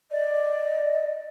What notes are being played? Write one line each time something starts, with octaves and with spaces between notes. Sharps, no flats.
D5 D#5